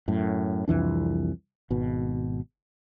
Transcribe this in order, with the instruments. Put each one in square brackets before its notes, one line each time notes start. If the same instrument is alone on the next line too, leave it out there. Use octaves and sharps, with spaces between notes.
[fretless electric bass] F#2 A2
C2 F2 E3 D4
G#1 B2